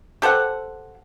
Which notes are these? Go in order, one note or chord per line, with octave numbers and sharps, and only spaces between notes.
G4 A4 C5 F#5